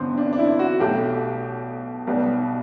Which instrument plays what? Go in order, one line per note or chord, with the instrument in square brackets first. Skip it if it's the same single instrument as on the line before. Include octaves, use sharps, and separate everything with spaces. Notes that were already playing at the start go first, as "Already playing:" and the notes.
Already playing: [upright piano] A1 G2 D3 B3 C4
D4
D4
E4
F#4
B1 B2 A3 G4
B1 B2 G3 B3